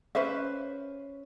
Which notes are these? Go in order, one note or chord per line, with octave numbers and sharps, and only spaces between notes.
C#4 B4 C5 E5